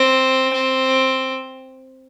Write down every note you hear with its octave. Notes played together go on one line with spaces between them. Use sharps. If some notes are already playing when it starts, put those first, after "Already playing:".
Already playing: C4
C4